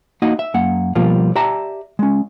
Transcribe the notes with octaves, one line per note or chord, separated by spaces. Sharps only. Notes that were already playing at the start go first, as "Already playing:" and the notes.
A#3 D#4 F#4 D#5 F#5
E5
F#2 A#3 F#5
B2 F3 G3 A#3 F4
G4 D5 E5 A5 A#5
G#3 C#4